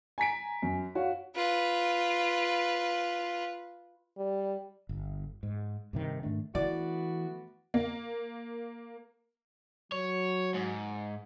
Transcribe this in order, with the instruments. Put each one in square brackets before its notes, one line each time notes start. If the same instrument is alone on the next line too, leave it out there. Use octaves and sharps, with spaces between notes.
[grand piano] G#5 A#5 B6 D7
F#2
F#4 C#5 F5
[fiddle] F4 B4
[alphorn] G3
[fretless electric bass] G1
G#2
G2 C3 D#3
G#2 D#3 A3 D4
[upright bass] E3 [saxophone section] A3 B3 F#4 [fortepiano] D5
[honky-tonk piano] A#3
[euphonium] F#3 [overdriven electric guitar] C#5
[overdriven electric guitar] G#2